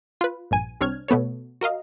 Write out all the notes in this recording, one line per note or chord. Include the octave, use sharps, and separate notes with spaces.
F4 B4
A#1 G2 G#5 D#7
C2 C4 D4 C#5 F6 G#6
B2 A3 B3 A4 C#5
F#4 A#4 D#5 F5